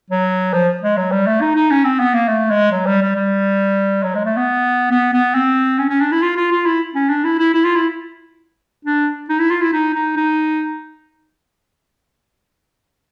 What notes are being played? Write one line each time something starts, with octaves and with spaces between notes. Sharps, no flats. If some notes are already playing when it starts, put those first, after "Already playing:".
F#3
F3
G#3
F#3
G3
A3
D#4
D#4
C#4
C4
B3
A#3
A3
G#3
F#3
G3
G3
G3
F#3
G#3
A3
B3
B3
B3
C4
C#4
C#4
D4
E4
F4
F4
F4
E4
C#4
D4
E4
E4
E4
F4
E4
D4
D#4
E4
F4
E4
D#4
D#4
D#4